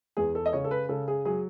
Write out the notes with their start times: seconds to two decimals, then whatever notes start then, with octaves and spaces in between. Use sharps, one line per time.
0.17 E2 G#4
0.35 A4
0.46 D#5
0.53 C#3 C#5
0.64 A4
0.71 B4
0.89 C#3 A4
1.08 G#4
1.25 F#3 G#4